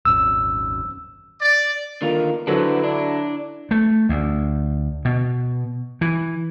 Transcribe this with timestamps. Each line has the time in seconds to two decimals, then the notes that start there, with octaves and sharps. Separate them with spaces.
0.05 D#1 G#1 F#2 E6
1.41 D5
2.02 D3 D#3 A#3 F4
2.47 D3 F#3 D4 E4 B4 C5
2.84 D4
3.71 A3
4.09 D2
5.05 B2
6.01 E3